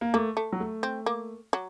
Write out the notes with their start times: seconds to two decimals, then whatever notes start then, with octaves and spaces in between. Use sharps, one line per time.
0.01 A#3
0.14 A3 A#3
0.37 A3
0.52 F#3
0.60 A3
0.83 C4
1.06 A#3
1.53 F#3